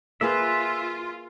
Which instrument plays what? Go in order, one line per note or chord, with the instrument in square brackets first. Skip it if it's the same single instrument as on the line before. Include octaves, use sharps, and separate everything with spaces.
[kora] A#3 G#4 B4 [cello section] F4 [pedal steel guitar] E5